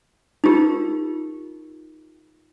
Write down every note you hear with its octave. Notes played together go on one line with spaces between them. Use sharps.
D#4 F4 G4 A#4